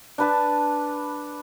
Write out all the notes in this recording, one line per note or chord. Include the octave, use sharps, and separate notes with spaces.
D4 B4 A5